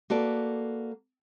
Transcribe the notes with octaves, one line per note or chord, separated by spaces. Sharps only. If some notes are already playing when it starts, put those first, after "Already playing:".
A#3 F#4 A4 B4 D5